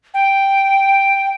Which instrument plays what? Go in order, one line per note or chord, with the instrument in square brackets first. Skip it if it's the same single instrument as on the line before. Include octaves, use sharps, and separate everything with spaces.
[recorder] G5